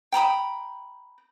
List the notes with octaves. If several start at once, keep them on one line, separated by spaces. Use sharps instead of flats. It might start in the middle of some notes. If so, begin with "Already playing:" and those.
G5 A#5 B5 D#6